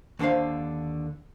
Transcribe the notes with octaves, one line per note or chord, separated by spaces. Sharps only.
D#2 D3 D4 C5 F5